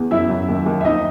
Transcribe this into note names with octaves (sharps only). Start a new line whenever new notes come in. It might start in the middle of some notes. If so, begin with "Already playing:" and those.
Already playing: E2
F#2 E4 E5
F#2
D#2
D#2
E5
F2 D#4 D#5